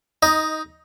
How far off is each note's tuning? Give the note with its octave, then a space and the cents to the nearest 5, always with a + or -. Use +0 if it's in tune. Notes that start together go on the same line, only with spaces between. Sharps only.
D#4 +15 D#5 +0